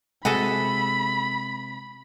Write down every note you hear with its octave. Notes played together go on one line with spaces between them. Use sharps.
C3 G#3 F#4 G#4 A4 B5